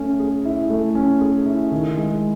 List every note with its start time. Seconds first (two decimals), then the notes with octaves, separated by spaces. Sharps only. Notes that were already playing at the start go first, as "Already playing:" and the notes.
Already playing: A3 C#4
0.20 G#4
0.45 E4
0.70 A3
0.95 C#4
1.21 G#4
1.46 E4
1.72 D#3
1.97 G#3